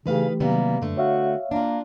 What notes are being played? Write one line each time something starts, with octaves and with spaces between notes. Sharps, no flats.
C#3 E3 A3 D#4 G4 B4 F5
C3 D#3 F#3 G3 A#3 B3
F#2 D3 A3
F#4 C#5 E5 F5
A#3 D4 F4